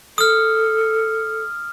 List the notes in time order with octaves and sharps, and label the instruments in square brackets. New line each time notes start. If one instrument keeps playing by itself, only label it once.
[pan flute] A4 [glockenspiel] D#6 F6